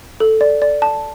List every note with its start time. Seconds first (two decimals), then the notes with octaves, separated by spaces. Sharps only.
0.20 A4
0.41 D5
0.62 D5
0.82 A5